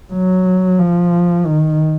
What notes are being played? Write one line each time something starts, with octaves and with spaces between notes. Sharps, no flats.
F#3
F3
D#3